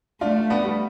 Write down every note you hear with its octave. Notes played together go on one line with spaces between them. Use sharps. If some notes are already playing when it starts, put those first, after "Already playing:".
A3 D4 F4
B3 D4
G3